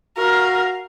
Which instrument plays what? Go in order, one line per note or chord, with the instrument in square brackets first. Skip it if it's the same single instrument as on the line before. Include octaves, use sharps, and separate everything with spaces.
[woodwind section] F#4 F5 [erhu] A#4